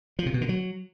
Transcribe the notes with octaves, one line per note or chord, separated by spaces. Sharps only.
F3
C3
B2
D3
F#3